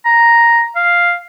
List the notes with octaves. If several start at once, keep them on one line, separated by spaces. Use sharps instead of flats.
A#5
F5